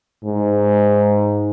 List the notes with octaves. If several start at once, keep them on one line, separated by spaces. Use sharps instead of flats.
G#2